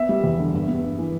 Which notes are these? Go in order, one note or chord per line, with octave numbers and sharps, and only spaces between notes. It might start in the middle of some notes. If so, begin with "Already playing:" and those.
Already playing: B3 E5
G3
E2
D3
G2
B3
G2
E3